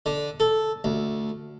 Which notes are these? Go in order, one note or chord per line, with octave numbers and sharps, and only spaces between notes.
D3
A4
D2